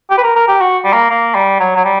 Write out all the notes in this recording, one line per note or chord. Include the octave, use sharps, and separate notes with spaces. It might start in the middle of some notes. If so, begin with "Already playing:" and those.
G4
B4
A#4
A#4
G4
F#4
G3
A#3
A#3
G3
F#3
F#3
G3